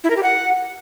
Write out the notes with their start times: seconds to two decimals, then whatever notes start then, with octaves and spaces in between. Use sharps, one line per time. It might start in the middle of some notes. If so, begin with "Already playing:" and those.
0.04 E4
0.10 A#4
0.17 G4
0.23 F#5